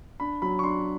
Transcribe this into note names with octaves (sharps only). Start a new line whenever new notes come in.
D4 B5
F#3 B5
C#6
D4 C6